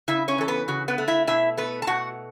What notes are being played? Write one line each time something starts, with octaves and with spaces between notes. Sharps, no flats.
C#3 E4 E5
C#4 C#5
E3 A4
B3 B4
C#3 F#4
B3 B4
A3
E4 E5
B2 E4 E5
A3 B3 B4
A5
B2 F#4 F#5